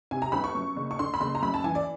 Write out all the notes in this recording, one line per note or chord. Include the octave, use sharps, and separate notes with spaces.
C3 G#5
A#5
G1 B5
C#6
F#2
F#1
C#6
D3 C6
B5
F#1 C6
A#5
F#2 B5
A5
E3 G#5
D5